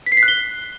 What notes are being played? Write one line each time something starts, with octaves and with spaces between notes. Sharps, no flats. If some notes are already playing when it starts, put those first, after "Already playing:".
B6
C7
B6
F#6
G7